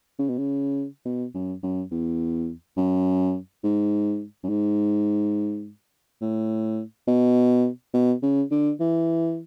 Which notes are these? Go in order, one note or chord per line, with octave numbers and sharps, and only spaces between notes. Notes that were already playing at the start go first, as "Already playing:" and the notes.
C#3
B2
C#3
B2
F#2
F#2
E2
F#2
G#2
F#2
G#2
A2
B2
B2
C#3
D3
E3